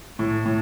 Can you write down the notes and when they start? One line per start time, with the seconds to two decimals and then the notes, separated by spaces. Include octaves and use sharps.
0.19 A2
0.45 A2